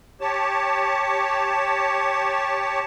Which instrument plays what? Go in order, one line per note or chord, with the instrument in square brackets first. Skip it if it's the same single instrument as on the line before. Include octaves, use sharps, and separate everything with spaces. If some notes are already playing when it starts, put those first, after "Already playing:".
[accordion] G4 C#5 A5